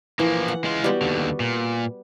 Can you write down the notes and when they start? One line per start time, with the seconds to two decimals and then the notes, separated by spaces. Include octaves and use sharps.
0.19 E3 F3 A#3
0.48 F#5
0.64 G#3 F4
0.84 G3 B3 F#4
1.02 D#2 D3
1.40 A#2